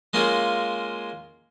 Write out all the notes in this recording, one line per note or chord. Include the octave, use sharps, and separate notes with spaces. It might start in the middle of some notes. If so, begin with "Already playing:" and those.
G#3 A#3 C#4 F4 G#4